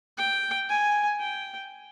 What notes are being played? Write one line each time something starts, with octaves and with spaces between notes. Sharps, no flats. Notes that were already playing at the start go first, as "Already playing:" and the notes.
G5
G#5
G5